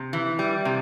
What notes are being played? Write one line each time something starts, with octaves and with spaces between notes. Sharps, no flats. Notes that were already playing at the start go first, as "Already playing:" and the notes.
Already playing: C3
E3
G3
C3